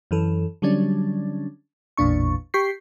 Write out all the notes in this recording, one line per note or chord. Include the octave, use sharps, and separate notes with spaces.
F#2 E3 A4
D3 F#3 G3 C#4 D4
A1 E2 A#2 D4 C#6
G4 C#6 G6 B6 C7